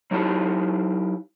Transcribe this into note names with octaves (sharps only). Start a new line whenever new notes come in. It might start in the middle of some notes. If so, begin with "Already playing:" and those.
F#3 D#4 E4 G4 A5